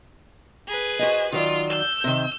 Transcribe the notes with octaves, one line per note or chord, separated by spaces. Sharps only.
G#4 B4
F#4 C5 D#5
D#3 F#3 F4 D5
E6 G6
C3 D#3